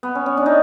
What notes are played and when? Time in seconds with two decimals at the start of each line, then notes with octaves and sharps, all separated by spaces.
0.03 B3
0.15 C#4
0.26 C#4
0.37 D4
0.46 D#4